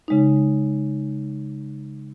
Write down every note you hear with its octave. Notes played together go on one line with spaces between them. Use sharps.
C#3 G#3 D#4